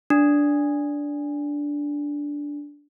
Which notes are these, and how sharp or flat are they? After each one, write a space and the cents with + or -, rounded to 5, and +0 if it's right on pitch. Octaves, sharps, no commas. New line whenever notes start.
D4 -10